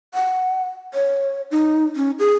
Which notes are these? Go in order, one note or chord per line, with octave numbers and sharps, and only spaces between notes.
F#5
C#5
D#4
C#4
G#4